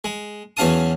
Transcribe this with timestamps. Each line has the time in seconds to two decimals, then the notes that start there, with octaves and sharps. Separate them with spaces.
0.04 G#3
0.57 E2 F#3 C#4 F5 A5 D#6